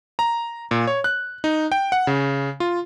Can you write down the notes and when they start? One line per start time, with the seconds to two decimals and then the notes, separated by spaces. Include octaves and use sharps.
0.19 A#5
0.71 A#2
0.87 C#5
1.04 F#6
1.44 D#4
1.72 G5
1.92 F#5
2.07 C#3
2.60 F4